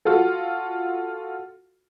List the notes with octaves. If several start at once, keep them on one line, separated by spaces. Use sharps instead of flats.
F4 F#4 A4